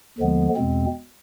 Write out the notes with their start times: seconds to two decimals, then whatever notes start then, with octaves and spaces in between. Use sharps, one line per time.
0.18 D#2 D3 F3 G#3 B3
0.56 E2 B2 G#3 C4